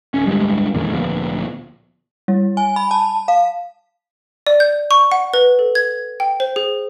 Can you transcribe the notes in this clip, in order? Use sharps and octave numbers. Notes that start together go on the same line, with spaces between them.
D1 C#4
D1 G2 G3 G#3
E2 A#2 D#3 G#3
D2 A#2 F3 B3
G3
G#5
B5
A5
F5
D5
G6
C#6
F#5
B4
A4
G#6
G5
C5
G#4